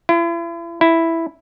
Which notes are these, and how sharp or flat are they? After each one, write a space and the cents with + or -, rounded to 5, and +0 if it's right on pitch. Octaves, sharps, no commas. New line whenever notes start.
E4 +40
E4 +0